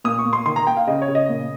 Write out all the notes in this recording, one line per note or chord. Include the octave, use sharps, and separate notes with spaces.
A#2 D#6
C#6
A#2
C6
D#3 C6
A#5
A#3 G5
F5
C#3 D#5
C#5
C#3
D#5
A#2